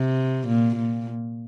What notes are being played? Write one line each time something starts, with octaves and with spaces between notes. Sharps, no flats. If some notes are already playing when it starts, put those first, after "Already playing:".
Already playing: C3
A#2
A#2